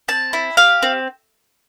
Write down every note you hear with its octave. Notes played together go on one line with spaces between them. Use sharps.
C4 A5
E4
G4 F5
C4